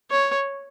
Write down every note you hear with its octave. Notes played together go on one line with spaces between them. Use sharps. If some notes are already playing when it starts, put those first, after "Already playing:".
C#5